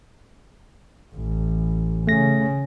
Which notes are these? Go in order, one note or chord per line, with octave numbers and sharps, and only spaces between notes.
A1
C#3 A3 A#6